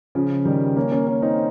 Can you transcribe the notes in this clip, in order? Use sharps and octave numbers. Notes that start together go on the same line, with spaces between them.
C#3 F3
D#3 G3
A#3 C#4
A#3 C#4
A#3 C#4
C4 D#4